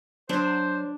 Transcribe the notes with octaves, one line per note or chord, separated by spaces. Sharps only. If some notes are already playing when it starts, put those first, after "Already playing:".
F#3 D4 C5